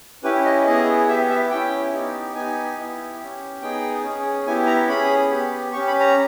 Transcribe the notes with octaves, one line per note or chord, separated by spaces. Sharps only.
C#4 E4 G4 B4
D#5
B3 E4 G#4 D#5
B3 G4 E5
E5
C#4 E4 G4 G5
B3 D#4 G4
B3 D#4 G4 G#5
B3 E4 G4
C#4 G4
B3 D#4 G#4 G5
C#4 G#4
B3 E4 G4 G#5
A#5
C#4 G#4 B5
B3 G4
C#4 G4 C#6
B5
A#5